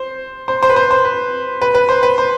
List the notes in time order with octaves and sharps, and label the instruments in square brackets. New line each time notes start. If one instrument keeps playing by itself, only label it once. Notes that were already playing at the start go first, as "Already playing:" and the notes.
Already playing: [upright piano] C5
C5
C5
B4
C5
C5
B4
B4
B4
C5
B4
C5